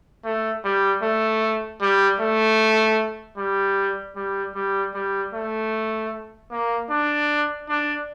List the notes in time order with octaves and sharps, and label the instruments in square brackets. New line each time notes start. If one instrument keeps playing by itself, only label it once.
[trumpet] A3
G3
A3
G3
A3
G3
G3
G3
G3
A3
A#3
D4
D4